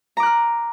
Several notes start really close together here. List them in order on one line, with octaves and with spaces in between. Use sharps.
A#5 D6 F#6 F6